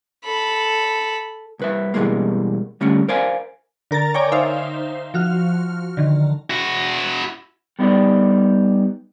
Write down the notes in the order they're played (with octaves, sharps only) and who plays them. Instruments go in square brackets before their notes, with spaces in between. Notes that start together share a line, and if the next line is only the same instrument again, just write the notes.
[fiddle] A4 B5
[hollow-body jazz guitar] C2 B4 E5
B2 E3 F3 G3 G#3 A#3
D3 G3 A3 C#4
A#4 C5 D5 F5 G#5
[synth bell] D3 A#4 A#5 A6
C#5 D5 G5 G#5 A#5 D6
D#4 C5 E5 F5
F3 F#4 F6
D3 D#3
[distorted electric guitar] E4 F#4
[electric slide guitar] G3 B3 D4 D#4 G4 D5